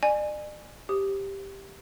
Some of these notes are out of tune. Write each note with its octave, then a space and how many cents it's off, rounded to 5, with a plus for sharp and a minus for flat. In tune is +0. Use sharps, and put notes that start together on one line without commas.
D5 +40 G#5 +0
G4 +0 C5 +0 D#6 +0